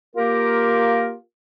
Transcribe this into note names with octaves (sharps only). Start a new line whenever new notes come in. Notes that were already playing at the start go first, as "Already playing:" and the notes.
A#3 F4 G4 A#4